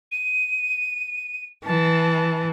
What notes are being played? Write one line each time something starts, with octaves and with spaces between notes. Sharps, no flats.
D#7
E3 A5